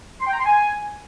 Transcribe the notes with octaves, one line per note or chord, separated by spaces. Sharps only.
C6
G5
A#5
C6
G#5